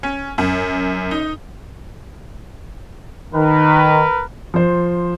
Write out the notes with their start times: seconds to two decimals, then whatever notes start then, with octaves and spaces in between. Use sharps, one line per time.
0.03 C#4
0.38 F#2
1.11 D#4
3.34 D#3 A#4 B4
4.54 F3 C5